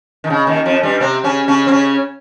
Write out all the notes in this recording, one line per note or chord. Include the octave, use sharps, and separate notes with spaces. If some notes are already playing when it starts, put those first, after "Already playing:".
D#3
C#3
D#2 D#3
F2 F3
G2 G3
C3 C4
C#3 C#4
C#3 C#4
C4
C#3 C#4